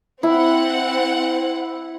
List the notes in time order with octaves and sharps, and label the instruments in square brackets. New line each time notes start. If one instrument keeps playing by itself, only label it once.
[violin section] C4 F#5 [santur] E4